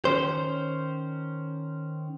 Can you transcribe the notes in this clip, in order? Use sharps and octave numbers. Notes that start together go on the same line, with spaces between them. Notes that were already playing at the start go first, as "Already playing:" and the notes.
D#3 C#4 C5